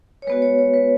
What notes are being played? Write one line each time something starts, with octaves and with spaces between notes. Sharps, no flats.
C#5
G#3 B3 F#4 B4
C#5
C#5
B4